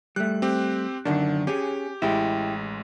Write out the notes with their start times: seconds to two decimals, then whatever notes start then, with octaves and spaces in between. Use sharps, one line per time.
0.16 G3 A3 F#6
0.42 C4 G4
1.05 F#2 D3 D#3 D4
1.47 C#4 G4 G#4
2.02 A1 G#3 E4 G4